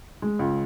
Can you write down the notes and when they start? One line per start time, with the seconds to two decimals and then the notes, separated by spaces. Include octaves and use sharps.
0.22 G#3
0.39 C#2